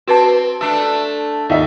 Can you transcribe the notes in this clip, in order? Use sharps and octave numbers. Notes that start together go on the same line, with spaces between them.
C4 F#4 B4 A5
A3 D4 A4
D#2 D#4 E5